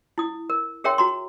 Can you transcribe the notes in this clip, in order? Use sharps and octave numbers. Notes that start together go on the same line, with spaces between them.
E4 D#6
A#4
G#4 A#4 C#5 E5 G5 C6
F#4 A#5 C6